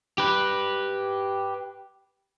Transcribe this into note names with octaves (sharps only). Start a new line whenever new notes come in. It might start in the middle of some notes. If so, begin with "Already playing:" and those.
G4 B4